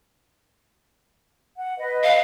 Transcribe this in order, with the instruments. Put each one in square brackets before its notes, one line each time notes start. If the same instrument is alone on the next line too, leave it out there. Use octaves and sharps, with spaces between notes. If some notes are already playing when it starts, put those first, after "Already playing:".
[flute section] F#5
B4 D#5
[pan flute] F5